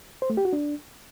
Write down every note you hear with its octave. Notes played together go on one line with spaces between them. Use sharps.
C5
A3
G4
F#4
D4